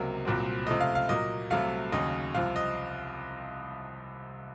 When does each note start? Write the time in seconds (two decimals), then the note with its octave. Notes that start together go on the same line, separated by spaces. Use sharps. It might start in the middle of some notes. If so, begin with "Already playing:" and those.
Already playing: C#2 C3 F#3 A#3
0.25 C2 A#2 F#3 C4
0.66 C#2 C3 F3 A3 C4 D#5
0.81 F5
0.95 F5
1.09 A#2 F#3 A#3 D#5
1.50 C2 C3 F#3 A3 F5
1.92 D#2 C#3 F#3 D#5
2.35 C2 C3 F3 F5
2.56 D#5